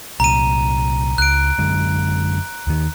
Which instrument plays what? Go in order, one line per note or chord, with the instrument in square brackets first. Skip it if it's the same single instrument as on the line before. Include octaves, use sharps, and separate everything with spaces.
[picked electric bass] C2 A#2 [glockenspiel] A#5 D#7
[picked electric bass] C#2 [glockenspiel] F#6 D7
[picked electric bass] F#2 D3 G#3
D#2 D#3